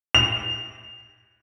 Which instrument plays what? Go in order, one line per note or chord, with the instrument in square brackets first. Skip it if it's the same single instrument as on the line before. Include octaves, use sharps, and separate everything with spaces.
[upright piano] F7